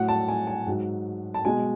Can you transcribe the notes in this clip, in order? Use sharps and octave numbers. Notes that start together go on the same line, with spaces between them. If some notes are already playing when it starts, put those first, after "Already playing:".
Already playing: A2 F#3 F#5
A5
G#5
G#5
G#2 F#3
A5
B2 G#3 G#5